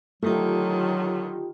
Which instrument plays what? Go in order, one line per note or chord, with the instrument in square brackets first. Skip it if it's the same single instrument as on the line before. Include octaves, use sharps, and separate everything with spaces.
[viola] D3 D#3 [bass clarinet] F#3 [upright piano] A3 [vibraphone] F4 G4 G5